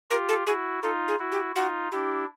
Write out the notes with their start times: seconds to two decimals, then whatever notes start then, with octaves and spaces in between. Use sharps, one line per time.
0.11 F4 G4 A#4
0.29 A4
0.47 E4 F#4 G#4
0.83 D#4 F4 A4
1.08 G#4
1.19 E4 F#4
1.32 G4
1.55 D#4 F4 F#4
1.92 D4 E4 G4